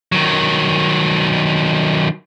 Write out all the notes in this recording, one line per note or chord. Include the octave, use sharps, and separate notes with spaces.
D#3 F#3